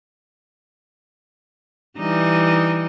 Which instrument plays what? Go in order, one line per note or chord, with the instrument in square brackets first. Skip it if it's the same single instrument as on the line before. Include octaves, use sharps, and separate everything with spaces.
[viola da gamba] E3 G3 D#4